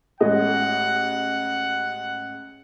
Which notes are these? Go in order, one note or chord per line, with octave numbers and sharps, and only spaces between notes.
A1 G#3 D#5 F#5